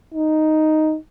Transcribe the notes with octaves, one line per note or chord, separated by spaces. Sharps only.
D#4